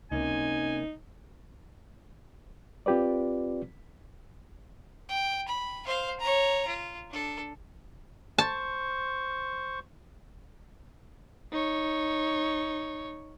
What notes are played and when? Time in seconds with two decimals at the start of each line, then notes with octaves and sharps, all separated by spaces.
0.12 C#2 C3 A#3 C#4 D#4 G#5
2.86 C4 F4 G4 B4 D5
5.09 G5
5.48 B5
5.86 C5 F5
6.20 C#5 A#5
6.67 F4
7.10 D4 A4
8.38 C5 A5 C#6
11.52 D#4 C#5